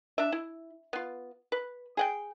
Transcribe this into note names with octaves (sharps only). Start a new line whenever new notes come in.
D4 E5
E4
B3 F4
B4
G#4 F#5 G5